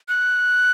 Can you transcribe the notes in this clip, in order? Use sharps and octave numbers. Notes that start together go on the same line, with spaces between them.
F#6